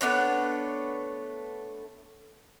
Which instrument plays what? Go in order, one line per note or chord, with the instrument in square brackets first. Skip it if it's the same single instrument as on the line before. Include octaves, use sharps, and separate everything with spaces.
[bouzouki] A3 B3 D4 C#5